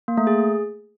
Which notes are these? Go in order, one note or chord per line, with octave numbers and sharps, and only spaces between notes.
A#3
A3
G#4